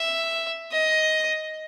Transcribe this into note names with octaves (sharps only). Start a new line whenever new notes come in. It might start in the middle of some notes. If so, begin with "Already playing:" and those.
Already playing: E5
D#5